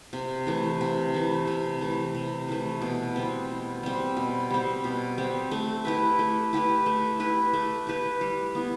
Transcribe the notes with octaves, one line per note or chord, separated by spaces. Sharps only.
C3
E3 A3
C3
E3 A3
C3
E3 A3
C3
E3 A3
B2
G3 C4
B2
G3 C4
B2
G3 C4
B2
G3 C4
A3
E4 G4 B4
A3
E4 G4 B4
A3
E4 G4 B4
A3
E4 G4 B4
G3
B3 E4